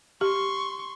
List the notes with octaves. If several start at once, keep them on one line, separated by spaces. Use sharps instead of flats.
G4 C6 C#6